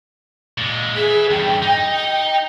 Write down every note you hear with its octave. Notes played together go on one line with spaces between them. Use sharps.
A#2 G#3
G#4 B4 E5
E2 G2 G5
D#4
G5